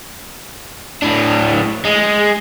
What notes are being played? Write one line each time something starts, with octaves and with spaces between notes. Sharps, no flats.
A2 D4
G#3